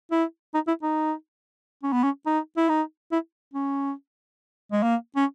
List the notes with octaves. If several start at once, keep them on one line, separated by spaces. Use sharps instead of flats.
E4
D#4
E4
D#4
C#4
B3
C#4
D#4
E4
D#4
E4
C#4
G#3
A#3
C#4